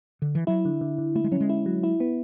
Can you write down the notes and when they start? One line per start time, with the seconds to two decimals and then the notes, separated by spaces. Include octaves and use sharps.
0.22 D3
0.35 E3
0.47 F#3 E4
0.65 D3
0.81 D3
0.98 D3
1.15 A3 E4
1.24 G#3
1.31 F#3 C#4
1.40 G#3
1.49 E4
1.66 F#3
1.83 E4
2.00 B3